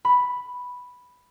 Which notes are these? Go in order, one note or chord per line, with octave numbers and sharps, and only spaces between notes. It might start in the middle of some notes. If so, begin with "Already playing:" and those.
B5